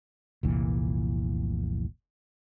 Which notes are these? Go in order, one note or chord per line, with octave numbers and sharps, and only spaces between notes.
F1 C2 A#2 E3